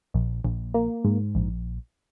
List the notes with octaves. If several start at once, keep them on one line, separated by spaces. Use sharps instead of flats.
A#1
A#1
A#3
G#2
A#1